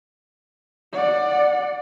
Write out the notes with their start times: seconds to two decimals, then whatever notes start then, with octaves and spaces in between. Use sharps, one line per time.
0.93 D5 F#5